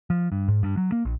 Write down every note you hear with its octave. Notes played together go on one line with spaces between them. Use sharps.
F3
G2
G#2
G2
F#3
A#3
A#1